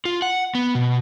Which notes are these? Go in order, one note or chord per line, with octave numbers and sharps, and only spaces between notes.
F4
F#5
B3
B2